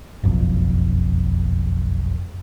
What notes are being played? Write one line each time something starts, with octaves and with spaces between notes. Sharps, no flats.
F#1 B1 F2